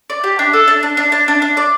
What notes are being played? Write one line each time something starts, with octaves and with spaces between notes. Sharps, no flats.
D5
G4
D4
A4
D4
D4
D4
D4
D4
D4
D5